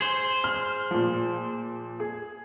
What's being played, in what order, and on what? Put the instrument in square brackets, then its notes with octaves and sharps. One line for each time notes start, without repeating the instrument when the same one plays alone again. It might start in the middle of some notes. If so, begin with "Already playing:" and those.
[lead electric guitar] G#4 C5
[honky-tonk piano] F6
A#2 F3
G#4